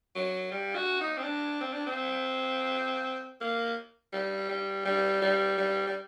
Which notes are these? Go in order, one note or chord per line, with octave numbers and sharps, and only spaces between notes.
F#3
G3
F#4
D#4
C4
D4
C4
D4
C4
A#3
G3
G3
G3
G3
G3
G3